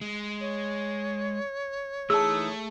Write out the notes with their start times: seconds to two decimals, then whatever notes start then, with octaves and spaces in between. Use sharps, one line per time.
0.01 G#3
0.41 C#5
2.10 E3 A3 D#4 G#4 A5 E6